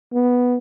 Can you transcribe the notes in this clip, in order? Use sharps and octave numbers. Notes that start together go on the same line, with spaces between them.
B3